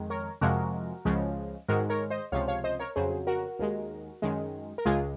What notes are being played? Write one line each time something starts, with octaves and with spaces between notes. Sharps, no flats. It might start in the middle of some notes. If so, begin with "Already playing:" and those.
Already playing: F2 D#3 G#3
A#4 C#5
F2 C3 F3 G#3 F#4 A#4
C#2 C#3 F3 G#3
G#2 D#3 G#3 F#4 A#4
A#4 C#5
C5 D#5
C#2 C3 F3 C#5 F5
C#5 F5
C5 D#5
A#4 C#5
F2 C#3 F#3 G#4 C5
F#4 A#4
D#2 D#3 G#3
F#2 D#3 G#3
A#4
C#2 C#3 G#3 F4 G#4